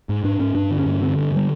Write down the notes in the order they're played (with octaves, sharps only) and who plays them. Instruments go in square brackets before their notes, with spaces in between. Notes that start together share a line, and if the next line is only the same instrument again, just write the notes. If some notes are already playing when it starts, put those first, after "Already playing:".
[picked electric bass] G#2
G#2 D4
G#2 C#4
G2 D4
D3
C#4
G2
D3 C4
G2
D3 G3